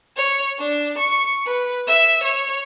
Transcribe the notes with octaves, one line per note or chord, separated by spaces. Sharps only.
C#5
D4
C#6
B4
E5
C#5